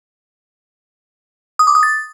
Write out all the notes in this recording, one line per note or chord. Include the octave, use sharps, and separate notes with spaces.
D#6
D6
D#6
A6